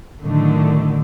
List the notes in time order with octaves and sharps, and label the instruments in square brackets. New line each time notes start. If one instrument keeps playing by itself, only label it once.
[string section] A2 D3 D#3 F#3 A3